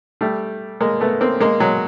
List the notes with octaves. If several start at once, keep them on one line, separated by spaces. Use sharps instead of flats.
G3 A3
G#3 A#3
A3 B3
A#3 C4
G#3 A#3
F#3 G#3